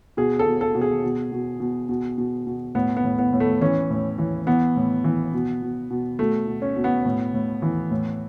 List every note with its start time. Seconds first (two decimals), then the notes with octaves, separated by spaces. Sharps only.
0.17 B2 G#4
0.39 A4
0.46 B2
0.61 A4
0.75 B2
0.81 G#4
1.04 B2
1.32 B2
1.60 B2
1.89 B2
2.18 B2
2.47 B2
2.75 A2 B3
2.97 B3
3.04 A2
3.18 B3
3.33 A2
3.40 A3
3.61 E3 C#4
3.90 A2
4.18 E3
4.47 E3 B3
4.76 A2
5.04 E3
5.33 B2
5.62 B2
5.91 B2
6.19 B2 A3
6.47 B2
6.62 C#4
6.76 B2
6.84 B3
7.05 A2
7.34 A2
7.62 E3
7.91 A2